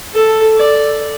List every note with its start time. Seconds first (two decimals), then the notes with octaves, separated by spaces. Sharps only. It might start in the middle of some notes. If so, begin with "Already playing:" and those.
0.13 A4
0.57 D5